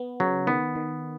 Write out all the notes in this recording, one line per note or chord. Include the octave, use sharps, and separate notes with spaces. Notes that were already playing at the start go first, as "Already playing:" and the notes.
Already playing: B3
C#3 F#3
D#3 B3
D#3